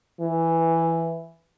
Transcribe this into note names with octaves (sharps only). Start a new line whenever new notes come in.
E3